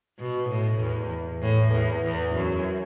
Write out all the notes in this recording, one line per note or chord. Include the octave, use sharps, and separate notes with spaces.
B2
A2
E2
A2
E2
E2
F#2